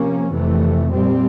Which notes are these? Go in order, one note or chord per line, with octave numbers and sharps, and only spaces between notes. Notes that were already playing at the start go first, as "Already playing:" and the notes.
Already playing: C3 F3 A#3 C#4
F2 C3 E3 A3
A#2 G3 C4